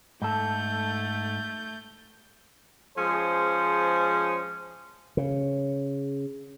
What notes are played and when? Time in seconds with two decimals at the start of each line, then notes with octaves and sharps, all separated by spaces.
0.22 G#2 A3 A4 G6
2.98 F3 G#3 C#4 G#4 C5
5.17 C#3